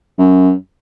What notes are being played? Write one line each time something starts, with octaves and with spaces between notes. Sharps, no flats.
F#2